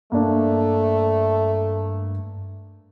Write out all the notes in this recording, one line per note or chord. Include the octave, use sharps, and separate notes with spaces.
G2 A3 A#3 D4